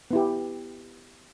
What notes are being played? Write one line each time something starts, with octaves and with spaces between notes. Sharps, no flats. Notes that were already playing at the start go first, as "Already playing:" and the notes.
B3 E4 G4